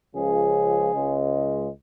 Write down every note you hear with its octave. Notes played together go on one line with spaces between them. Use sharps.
C#2 C#3 F3 G#4
C#2 C#3 G#3